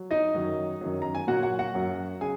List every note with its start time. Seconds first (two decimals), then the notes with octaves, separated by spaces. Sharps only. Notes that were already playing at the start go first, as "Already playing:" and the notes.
Already playing: F#3
0.11 D#4 D#5
0.34 F#2 D#3 F#3
0.81 F#2 D#3 F#3
1.02 A#5
1.15 G#5
1.28 A#2 F#3 F#4 F#5
1.43 F#4 F#5
1.59 F#4 F#5
1.74 F#2 F#3
2.21 C#3 G#4 G#5